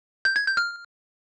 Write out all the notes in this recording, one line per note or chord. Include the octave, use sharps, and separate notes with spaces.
G6
G#6
G6
F6